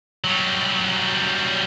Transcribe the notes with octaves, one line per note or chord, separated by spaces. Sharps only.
F#3 G3